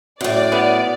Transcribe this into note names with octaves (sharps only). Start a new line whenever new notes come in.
F#2 A2 D5
B3